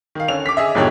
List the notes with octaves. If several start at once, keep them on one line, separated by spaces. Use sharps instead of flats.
D#3 F5
D3 C#4 F7
D6 B6
G#4 D#5 E5
B1 F2 G#2 D3 G4 C#5